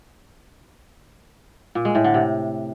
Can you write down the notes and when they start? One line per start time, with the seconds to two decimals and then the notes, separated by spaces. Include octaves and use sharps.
1.75 A#2
1.85 G#3
1.95 A2
2.04 D3
2.14 C3